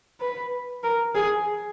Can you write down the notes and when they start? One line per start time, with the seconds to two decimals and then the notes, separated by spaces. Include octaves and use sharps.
0.21 B4
0.84 A#4
1.15 G#4